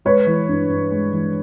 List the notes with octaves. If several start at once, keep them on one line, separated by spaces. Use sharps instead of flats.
G#3 B4 C#5
E3
G2
G2
G#3
E3